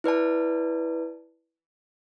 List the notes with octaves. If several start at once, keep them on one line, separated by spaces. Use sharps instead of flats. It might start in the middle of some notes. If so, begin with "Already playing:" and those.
E4 B4 D5 A5